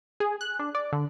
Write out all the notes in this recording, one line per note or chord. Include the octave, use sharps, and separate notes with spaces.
G#4
F#6
D4
D5
D3